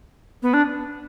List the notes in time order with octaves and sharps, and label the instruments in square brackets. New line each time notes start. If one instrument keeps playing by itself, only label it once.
[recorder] B3
D4